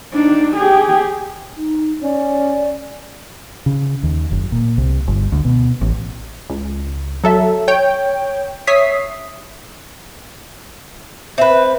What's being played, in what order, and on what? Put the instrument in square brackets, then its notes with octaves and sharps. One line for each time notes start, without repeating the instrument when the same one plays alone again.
[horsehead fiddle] D4 D#4
G4 G#4
[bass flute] D#4
[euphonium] C#4 [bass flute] D5
[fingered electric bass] C#3
D#2
F#1
A#2
C2
G1
D2
B2
A1
[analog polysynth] C#2
F#3 A4 E5
C#5 G5 G6
C#5 E5 D#6 B6 C7
[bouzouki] C4 B4 [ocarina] E5